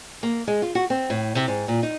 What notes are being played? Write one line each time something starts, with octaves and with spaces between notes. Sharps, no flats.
A#3
G#3
F4
F#4
C4
A2
C3
G#2
A#2
D#4